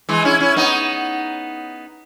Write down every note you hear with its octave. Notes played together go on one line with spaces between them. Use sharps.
E3 G#3
C#4 E4
C#4 E4
B3 D#4